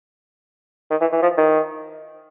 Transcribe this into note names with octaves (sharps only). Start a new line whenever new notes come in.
D#3
E3
E3
F3
D#3